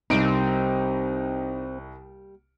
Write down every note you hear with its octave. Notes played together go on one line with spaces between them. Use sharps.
C2 G3 A#3 C4 D#4 D7